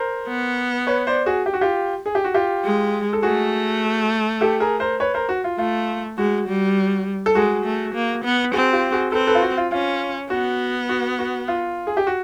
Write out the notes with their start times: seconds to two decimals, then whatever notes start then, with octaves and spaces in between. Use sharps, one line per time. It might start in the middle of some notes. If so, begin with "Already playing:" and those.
Already playing: A#4 C5
0.28 B3
0.87 B4 C#5
1.07 C5 D5
1.26 F#4 G#4
1.46 G4
1.54 F#4
1.61 F4 G4
2.06 G#4
2.15 G4
2.24 F#4
2.34 F4 G4
2.64 G#3
3.13 A4
3.22 A3 F#4 G#4
4.41 G4 A4
4.60 G#4 A#4
4.80 A#4 C5
5.00 B4 C#5
5.14 A#4 C5
5.29 F#4
5.44 F4
5.58 A3 F4
6.18 G#3 F#4
6.47 G3
7.26 A4
7.35 G#3 F#4 G#4
7.65 A3
7.94 A#3
8.24 B3
8.53 C4 F#4 G#4
8.73 F4 G4
8.92 F#4 G#4
9.12 C4 A4 B4
9.27 A4 B4
9.35 F4
9.42 F#4
9.57 F4
9.72 C#4 F4
10.30 B3 F#4
10.89 F#4
11.19 F#4
11.48 F4
11.87 G#4
11.97 G4
12.07 F#4